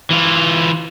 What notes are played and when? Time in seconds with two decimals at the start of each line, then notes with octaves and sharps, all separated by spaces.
0.10 E3 F4